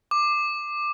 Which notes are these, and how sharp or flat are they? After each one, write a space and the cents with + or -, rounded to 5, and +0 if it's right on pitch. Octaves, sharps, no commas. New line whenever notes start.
D6 +15